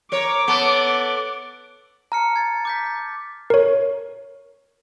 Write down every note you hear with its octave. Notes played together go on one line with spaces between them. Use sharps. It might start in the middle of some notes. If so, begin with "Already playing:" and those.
A#4 C#5 D6
B3 A4
A5 A#5 F6 C#7
G#6 A6
D6 G6 B6
A#4 C#5